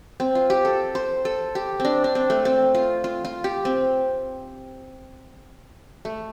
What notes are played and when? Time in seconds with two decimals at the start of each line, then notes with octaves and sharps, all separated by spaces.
0.20 C4
0.35 F4
0.50 G4
0.65 A4
0.95 C5
1.25 A4
1.55 G4
1.80 C4
1.85 D4
2.04 D4
2.15 C4
2.30 A3
2.45 C4
2.75 F4
3.04 F4
3.25 F4
3.44 G4
3.65 C4
6.05 A3